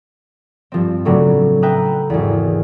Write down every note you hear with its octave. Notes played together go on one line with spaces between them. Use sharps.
G2 F3 C4
A2 C#3 F#3 A3 C4 D4
B4 E5 G5 A#5 D#6 F#6
G#1 E2